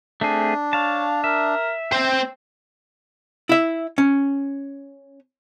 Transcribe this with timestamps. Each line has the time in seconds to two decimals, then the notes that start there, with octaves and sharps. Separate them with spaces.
0.21 A3 C4 D4 G#4
0.73 C#5 F5 A5
1.24 A#4 E5
1.93 C4 C5 G5
3.49 E4 E5
3.98 C#4